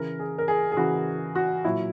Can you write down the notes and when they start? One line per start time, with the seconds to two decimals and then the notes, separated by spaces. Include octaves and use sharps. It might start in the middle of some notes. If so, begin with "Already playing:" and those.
Already playing: C#3 E3 A#4
0.19 G#4
0.38 A#4
0.48 G#4
0.72 G#4
0.77 C#3 E3 F#4
1.35 F#4
1.64 A#2 F#3 E4